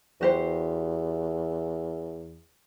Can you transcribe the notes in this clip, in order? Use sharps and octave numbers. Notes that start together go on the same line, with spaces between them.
E2 F#4 G4 C5